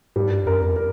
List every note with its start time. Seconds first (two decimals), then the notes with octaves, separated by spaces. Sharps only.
0.16 G#2 G3
0.31 G2
0.46 F#2 A#4
0.61 F2
0.76 A#4